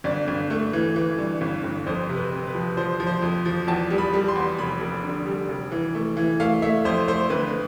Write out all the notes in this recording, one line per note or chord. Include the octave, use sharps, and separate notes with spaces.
G1 D5
G1
A3
E3
E3
G2
G1
G1
F2 C5
C3
B4
C4
B4
F3
F3 C5
F3
C5
F2
F3
E2 A5
G3
B5
G3
C6
E2
F1 B5
F1
D3
G3
F1
E3
A3
E3
A3 F5
A3 E5
F2 C5
A3 C5
G1 B4